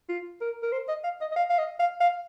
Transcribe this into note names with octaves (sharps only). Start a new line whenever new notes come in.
F4
A#4
A#4
C5
D#5
F5
D#5
D#5
F5
F5
D#5
F5
F5